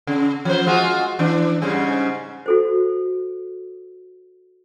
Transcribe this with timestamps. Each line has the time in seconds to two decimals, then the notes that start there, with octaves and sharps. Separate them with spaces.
0.07 C#3
0.45 F3 C5
0.66 G#3 F4 F#4
1.19 E3 D4
1.62 G#2 C#3 G3
2.46 F#4 A4 C5